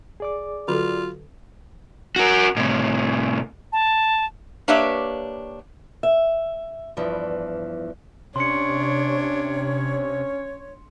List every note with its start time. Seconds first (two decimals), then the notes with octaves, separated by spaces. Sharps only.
0.20 G#4 D5 D6
0.68 D3 F#3 F4 A4
2.16 F#4 A#4
2.57 A2 C3
3.73 A5
4.68 A#3 D4 G4 B4 C#5 E5
6.03 E5
6.97 E2 G2 E3 F3
8.36 C3 C#4 D4 C#5 C6 C#7